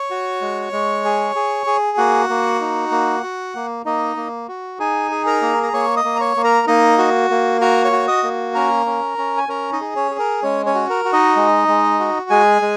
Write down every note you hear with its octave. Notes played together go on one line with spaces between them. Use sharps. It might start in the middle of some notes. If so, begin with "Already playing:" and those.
Already playing: C#5 C#6
F#4
G#3
G#3
G#4
G#4
G#4
A#3 F#4 F#5
A#3
D#4
A#3
F#4
A#3
A#3 D#4 D#5
A#3
F#4
D#4 G#4 G#5
G#4
A#4 A#5
A#3
A#5
A#3 C#5 C#6
D#5 D#6
A#3
A#5
C#5 C#6
A#3
A#4 A#5
A#3 D#4 D#5
F#4
A#3
F#4 A#4 A#5
C#5 C#6
F#4
D#5 D#6
A#3
C#4 A#4 A#5
C#4
C#4
G#5
C#4 A#4 A#5
D#4 D#5
G#4
C#4 C#5
G#4
A#4
G#3 C#4 C#5
C#4 C#5
F#4
A#4
F#4
D#4 D#5
G#3
G#3
F#4
G#3 G#4 G#5
G#3